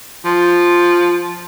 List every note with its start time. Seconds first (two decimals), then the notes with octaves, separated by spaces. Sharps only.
0.24 F3